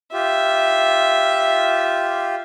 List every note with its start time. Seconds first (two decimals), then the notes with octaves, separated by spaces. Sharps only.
0.13 F4 G4 E5